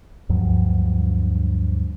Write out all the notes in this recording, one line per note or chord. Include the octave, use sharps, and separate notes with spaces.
D2 G2 F3 F#3